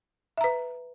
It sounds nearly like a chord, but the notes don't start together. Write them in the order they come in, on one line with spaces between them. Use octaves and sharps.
E5 A#5 B4